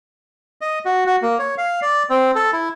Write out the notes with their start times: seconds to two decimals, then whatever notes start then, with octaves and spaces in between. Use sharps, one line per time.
0.61 D#5
0.85 F#4
1.06 F#4
1.22 A#3
1.39 C#5
1.58 F5
1.82 D5
2.10 C4
2.35 A4
2.53 E4